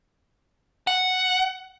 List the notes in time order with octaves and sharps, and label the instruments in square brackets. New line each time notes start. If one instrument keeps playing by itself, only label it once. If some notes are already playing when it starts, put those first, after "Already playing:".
[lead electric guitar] F#5